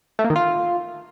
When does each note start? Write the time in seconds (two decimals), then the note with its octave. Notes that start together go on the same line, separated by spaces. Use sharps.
0.19 A3
0.24 A#3
0.30 D#3
0.36 F4